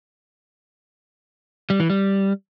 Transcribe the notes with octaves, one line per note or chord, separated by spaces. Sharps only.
G3
E3
G3